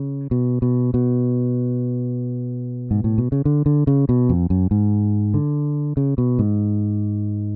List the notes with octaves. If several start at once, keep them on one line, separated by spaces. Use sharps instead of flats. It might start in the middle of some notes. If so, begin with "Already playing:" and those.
Already playing: C#3
B2
B2
B2
G#2
A2
B2
C#3
D3
D3
C#3
B2
F2
F#2
G#2
D3
C#3
B2
G#2